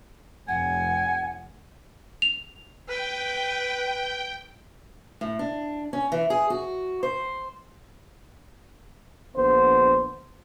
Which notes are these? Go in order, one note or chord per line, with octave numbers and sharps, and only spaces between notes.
F1 F#5 G#5
F7
B4 G5
A2
D4
C#4
E3
G#4
F#4
C5
A#1 D3 B3 C5